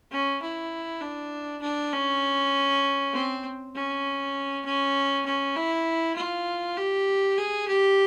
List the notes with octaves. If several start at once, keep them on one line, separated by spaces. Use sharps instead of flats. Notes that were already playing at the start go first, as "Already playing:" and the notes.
C#4
E4
D4
D4
C#4
C4
C#4
C#4
C#4
E4
F4
G4
G#4
G4